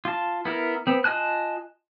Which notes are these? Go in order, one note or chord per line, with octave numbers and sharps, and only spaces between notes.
F4 A5
B3 E4 A#4
B3 C4
F4 D#5 G#5 A5 F#6